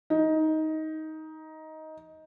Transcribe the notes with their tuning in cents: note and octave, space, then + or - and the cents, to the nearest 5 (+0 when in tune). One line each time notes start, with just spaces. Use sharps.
D#4 +15